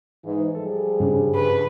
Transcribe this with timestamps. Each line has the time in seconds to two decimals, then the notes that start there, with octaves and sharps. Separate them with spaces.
0.25 G#2 E3
0.55 F3 G3 G#4 A4
1.00 G2 C#3 D4
1.35 B4